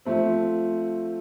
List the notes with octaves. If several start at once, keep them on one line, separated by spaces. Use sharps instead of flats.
F3 A3 C4